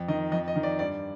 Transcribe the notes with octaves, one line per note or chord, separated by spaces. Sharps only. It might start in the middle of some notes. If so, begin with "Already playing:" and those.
Already playing: F2
D#3 D#5
F2 D#5
D#5
D#3
D5
G2 D5